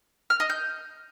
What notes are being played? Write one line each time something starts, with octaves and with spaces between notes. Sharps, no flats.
F6
D#5
G6